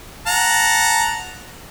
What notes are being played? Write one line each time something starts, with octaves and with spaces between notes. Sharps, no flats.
F#5 A5 A#5